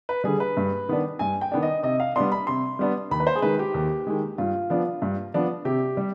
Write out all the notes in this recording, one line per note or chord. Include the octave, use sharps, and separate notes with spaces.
B4
D3 G3 G#4
B4
G2
D#3 B3 D4
G2 G#5
G5
D#3 B3 D4
D#5
C3 D#5
F5
G3 B3 D4 C6
B5
C3 C6
G3 B3 D4
D#2 B5
B4
C5
G#4
D#3 G#3 B4
G4
D#2
D#3 G#3
G2 F4
F3 B3 D4
G2
F3 B3 D4
C3 G4
G3